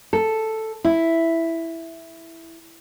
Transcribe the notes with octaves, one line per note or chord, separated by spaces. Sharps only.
A4
E4